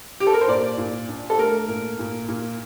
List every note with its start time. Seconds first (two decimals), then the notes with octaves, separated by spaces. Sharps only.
0.20 G4
0.27 A4
0.33 A#4
0.41 C5
0.47 A#2 D5
0.78 A#2
1.08 D4
1.30 A4
1.38 A3 A#4
1.68 A#2
1.99 A#2
2.29 A#2